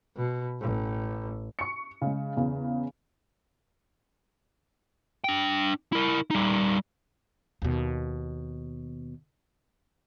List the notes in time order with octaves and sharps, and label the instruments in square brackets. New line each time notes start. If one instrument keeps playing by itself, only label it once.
[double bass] B2
A1
[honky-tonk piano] C#6 C#7
C#3 G#3
E2 C#3
[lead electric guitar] D4 G5
E4 A#4
G3 D#4
[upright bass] D#2 B2